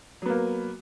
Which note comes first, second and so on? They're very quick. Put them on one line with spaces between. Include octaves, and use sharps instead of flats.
F#3 B3 A#3